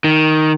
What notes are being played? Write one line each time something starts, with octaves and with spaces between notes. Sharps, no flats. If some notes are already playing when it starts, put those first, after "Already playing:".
D#3